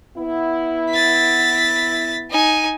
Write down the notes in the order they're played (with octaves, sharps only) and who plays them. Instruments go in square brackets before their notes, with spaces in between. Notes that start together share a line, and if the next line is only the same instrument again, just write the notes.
[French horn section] B3 E4
[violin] A6 B6
D#4 G#5